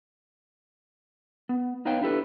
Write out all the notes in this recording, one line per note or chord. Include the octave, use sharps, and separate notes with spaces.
B3
B3 D#4 B4 C#5 F5 G5
D4 E4 G4 A4 B4